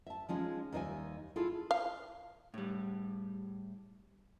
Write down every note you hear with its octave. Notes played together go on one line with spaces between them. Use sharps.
E5 A5
F3 G#3 C#4 D#4
D#2 G3 D#4 C5 E5 G#5
E4 F4 G#4 A4
F5
A2 G3